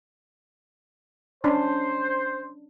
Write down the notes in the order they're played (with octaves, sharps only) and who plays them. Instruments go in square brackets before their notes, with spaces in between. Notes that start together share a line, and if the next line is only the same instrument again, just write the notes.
[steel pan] C#4 D4 [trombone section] C5